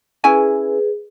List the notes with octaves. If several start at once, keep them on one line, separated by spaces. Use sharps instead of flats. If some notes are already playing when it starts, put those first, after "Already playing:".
C#4 E4 G#4 B4 G#5